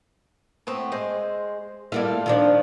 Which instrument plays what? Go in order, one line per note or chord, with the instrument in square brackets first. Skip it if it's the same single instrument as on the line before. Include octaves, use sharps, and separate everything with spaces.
[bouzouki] A2 B3 C4
G#3 C5
[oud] G3 A#3 E4 [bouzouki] F4 A4
[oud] D#3 F3 D4